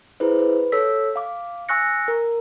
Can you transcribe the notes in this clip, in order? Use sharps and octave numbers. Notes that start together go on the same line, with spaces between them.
E4 G#4 B4 C5
B4
A4 C#5 E6 B6
F5 D6
G#5 C#6 E6 F#6 A#6 C#7
A#4